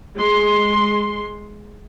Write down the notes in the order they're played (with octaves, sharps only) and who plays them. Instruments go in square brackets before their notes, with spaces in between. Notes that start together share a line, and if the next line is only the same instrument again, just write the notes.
[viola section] G#3 C6